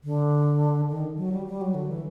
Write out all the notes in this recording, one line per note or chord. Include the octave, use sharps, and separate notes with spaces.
D3
D#3
F#3
G3
G3
F#3
D3
E3